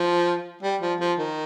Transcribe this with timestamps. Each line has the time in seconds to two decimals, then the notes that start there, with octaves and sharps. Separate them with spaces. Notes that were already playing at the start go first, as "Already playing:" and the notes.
Already playing: F3
0.63 G3
0.81 F3
1.00 F3
1.19 D#3